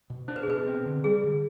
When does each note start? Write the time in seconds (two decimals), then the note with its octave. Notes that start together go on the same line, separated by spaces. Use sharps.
0.10 B2
0.28 D4 C5
0.36 B4
0.43 G#4
0.47 B2 B4
0.67 C4
0.85 D3
1.04 G3 G#4
1.24 D3